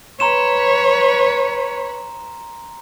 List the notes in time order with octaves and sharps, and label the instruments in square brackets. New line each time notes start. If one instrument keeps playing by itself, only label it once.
[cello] B4 C#5 [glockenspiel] A#5 C6 E7